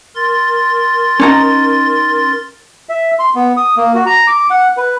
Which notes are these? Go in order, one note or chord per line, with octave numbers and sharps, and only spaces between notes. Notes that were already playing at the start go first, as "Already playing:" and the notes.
A#4 C6 A6
C#4 D#4 A#5
E5
C6
B3
D#6
A#3
F#4
A#5
D6
F#5
B4